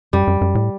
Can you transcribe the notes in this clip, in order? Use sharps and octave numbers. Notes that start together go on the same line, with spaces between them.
F#2 G3
F#2
F#2
A2